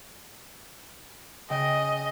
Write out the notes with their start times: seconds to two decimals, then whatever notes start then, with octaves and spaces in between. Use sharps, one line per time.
1.50 C#3 D#5 G5